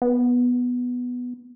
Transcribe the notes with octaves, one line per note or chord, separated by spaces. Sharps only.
B3